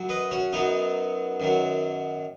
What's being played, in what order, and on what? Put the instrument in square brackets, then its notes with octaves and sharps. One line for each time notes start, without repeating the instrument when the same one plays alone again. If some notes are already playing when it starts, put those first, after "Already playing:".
Already playing: [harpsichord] F#2 F#3
B4 D#5
C#4 F#4
F#2 F#3 B3 D#4
F#2 D#3 F#3